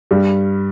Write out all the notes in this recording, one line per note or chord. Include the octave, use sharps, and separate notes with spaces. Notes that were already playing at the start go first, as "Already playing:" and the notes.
G2 G3